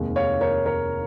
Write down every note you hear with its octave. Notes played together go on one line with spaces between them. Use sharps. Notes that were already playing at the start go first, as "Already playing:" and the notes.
Already playing: F1 D#2 D#3 G#3
C#5 F5
A#4 C#5
A#4 C#5